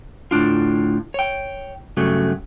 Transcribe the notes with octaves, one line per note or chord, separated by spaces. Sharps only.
D2 A2 D4 F4
C#5 G5
G2 C#3 F#3 A3